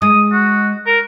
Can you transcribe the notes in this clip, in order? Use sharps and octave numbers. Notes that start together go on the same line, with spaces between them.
G#3 D#6
F#4
A#4